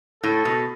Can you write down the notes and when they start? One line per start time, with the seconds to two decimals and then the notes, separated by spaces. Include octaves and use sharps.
0.23 A2 A4
0.45 B2